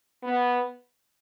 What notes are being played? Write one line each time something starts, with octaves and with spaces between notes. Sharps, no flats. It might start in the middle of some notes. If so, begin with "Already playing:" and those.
B3